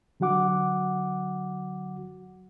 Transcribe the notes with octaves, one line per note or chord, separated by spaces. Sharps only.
D3 F#3 F#4 F#5 D6